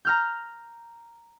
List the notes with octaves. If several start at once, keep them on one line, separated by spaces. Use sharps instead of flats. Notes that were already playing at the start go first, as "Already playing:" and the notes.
A#5 F6 G6